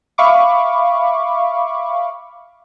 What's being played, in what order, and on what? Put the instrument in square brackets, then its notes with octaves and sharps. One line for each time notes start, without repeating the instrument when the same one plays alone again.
[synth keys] E5 F5 B5 C#6 D6